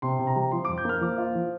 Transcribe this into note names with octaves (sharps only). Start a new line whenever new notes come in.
C3 C6
C3
A#5
G3
F3 C6
F2 D6
G6
A#3 F6
F3 D6
F4
F3